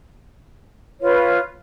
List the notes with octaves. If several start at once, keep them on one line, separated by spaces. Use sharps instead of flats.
F4 B4 C#5